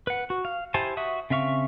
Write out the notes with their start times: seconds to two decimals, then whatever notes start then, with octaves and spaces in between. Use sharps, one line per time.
0.07 B4 F#5
0.30 F#4
0.45 F5
0.74 E4 G4 C5 G#5 A5
0.97 F#4 E5 D#6
1.30 C#3 C4 E5 F5 C#6